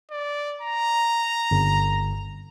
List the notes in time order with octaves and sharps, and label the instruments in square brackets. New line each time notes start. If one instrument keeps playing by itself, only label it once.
[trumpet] D5
A#5
[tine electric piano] G1